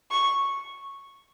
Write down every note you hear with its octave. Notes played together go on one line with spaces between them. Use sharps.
C#6